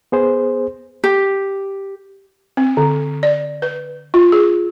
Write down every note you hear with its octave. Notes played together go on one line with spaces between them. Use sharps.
B3 G#4 C5
G4
C4
D3
D5
B4
F4
G#4